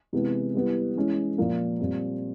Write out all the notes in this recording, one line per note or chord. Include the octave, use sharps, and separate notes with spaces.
C3 E3 G#3 B3
G3 B3 E4
E3 G#3 C#4
A#2 F3 A#3
A#2 G3 C4